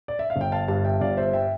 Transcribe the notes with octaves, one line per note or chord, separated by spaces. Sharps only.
D5
E5
F5
G1
G5
F5 A5
G2 F5 A5
E5 G5
G1 D5 F5
C5 E5
E5 G5